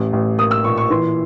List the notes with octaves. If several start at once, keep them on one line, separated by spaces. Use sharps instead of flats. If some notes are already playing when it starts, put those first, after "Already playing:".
Already playing: A1
A1
A#3 D#6
E6
A#2 C#6
C#6
E3 C6